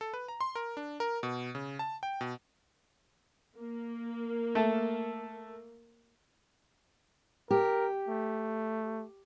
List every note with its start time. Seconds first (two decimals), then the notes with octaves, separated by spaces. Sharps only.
0.01 A4
0.14 B4
0.28 A#5
0.41 C6
0.55 A#4
0.77 D4
1.00 A#4
1.23 B2
1.55 C#3
1.79 A5
2.03 G5
2.21 B2
3.57 A#3
4.55 A3 A4
7.51 G4 A#4
8.09 A3